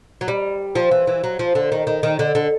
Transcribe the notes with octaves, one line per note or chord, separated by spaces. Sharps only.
F#3
G3
F3
E3
E3
F#3
F3
D3
D#3
D#3
D#3
D3
D3